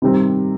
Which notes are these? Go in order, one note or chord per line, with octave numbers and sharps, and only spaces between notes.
C3 D#3 G3 C4